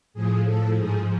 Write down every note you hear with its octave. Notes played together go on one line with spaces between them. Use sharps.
A2 F3 G#4
A4
G#2 F3 G#4